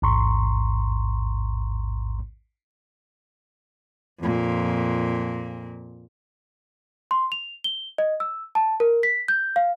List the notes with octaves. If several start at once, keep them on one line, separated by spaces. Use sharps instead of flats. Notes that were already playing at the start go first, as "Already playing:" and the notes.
A1 D#2 G#2 A#5 C6 C#6
F2 A#2
C6
F7
G7
D#5
E6
A5
A#4
B6
G6
F5